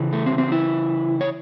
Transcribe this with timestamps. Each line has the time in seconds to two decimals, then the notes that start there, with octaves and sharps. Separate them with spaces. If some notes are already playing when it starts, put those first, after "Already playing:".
Already playing: C#3 E3
0.13 A3
0.26 C4
0.38 C4
0.52 E4
1.21 C#5